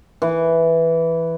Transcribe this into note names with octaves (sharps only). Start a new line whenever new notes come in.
E3